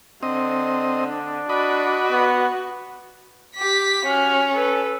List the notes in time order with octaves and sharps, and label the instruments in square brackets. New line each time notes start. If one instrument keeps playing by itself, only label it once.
[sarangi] D3 [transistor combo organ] C4 D#5
[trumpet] D4
[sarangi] F#4 [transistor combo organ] D5 D#5 B5
[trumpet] B3
[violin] G4 B6
[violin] C#4 [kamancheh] F#4 F6
[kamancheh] A4 B4